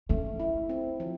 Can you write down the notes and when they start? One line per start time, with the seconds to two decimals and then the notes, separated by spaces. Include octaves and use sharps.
0.09 A3 C#4
0.40 E4
0.69 C4
1.00 F3